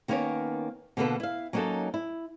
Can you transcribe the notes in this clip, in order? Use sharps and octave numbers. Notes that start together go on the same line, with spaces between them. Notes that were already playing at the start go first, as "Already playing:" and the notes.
D#3 A#3 B3 C#4 C#5
B2 D3 A#3 G#4 A4 B4
E4 F5
F#3 A#3 C#4 D#4 F#4 A4
E4